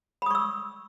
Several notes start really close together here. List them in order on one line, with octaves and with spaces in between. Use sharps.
B5 D#6 C#6 E6